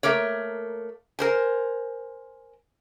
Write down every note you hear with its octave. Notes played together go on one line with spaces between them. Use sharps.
A3 A#3 A#4 C#5
A#4 C5 G#5